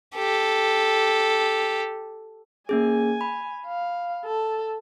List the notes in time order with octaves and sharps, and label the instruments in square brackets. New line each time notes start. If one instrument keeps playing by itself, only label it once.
[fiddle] G4 A4
[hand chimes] A#3 C#4 G#4 [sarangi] G#5
[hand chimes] B5
[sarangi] F5
A4